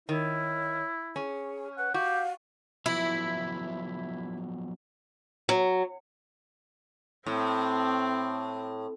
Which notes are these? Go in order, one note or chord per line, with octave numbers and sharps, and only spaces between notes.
D#3 E4 C#5
C#4 G#4
B4 F#5
F#4 G4 F5
F3 F#3 B3 E4
F#3
A2 C4